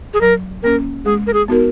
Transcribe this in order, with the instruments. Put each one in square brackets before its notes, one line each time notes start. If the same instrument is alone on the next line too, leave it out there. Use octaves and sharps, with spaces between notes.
[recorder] G#4
[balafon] F#3 [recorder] A#4
[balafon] A#3 C#4 [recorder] A#4
[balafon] G#3 [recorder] G#4
[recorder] A#4
G#4
[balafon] B3 D#4 F#4 A#4